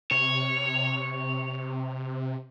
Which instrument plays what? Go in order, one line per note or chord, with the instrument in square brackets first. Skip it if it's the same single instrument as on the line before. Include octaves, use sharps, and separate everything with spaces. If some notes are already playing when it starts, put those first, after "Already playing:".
[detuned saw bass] C3 [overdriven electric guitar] C#5